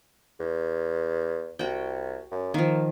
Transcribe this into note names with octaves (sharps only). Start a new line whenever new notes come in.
E2
C2 F#4 G5
F#2
D#3 F3 A#3